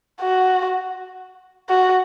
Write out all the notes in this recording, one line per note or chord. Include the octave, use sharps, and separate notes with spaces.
F#4
F#4